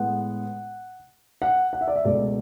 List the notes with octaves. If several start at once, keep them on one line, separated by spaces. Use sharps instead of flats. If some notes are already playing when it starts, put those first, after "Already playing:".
Already playing: A2 G#3 B3 F#5
F#5
F#5
E5
D5
E5
C#2 B2 A3 D5